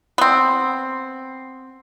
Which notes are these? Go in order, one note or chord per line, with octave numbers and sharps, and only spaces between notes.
B3 C4